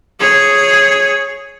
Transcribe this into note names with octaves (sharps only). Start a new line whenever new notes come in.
G#4 C#5